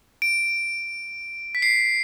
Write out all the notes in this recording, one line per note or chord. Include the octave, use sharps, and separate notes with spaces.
D7
B6
C7